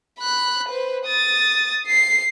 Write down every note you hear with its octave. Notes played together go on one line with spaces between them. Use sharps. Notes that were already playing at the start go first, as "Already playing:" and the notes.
B5 F#6
B4 C5
D#6 A6
C7